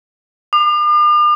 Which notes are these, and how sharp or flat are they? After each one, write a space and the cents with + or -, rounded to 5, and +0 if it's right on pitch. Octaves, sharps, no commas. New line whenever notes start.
D6 +45